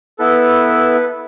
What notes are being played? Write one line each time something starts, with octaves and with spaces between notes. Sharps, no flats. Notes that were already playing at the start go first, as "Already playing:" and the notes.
B3 E4 A4 B4